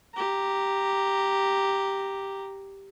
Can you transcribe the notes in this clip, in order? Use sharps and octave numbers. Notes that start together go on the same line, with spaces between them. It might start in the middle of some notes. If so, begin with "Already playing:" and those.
G4 A#5